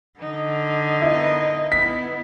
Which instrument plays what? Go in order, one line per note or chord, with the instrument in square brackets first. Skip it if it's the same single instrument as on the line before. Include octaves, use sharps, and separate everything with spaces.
[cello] D3 [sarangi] D#4
[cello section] B3 A#4 D#5 [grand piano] E4
[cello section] B3 E4 [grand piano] B6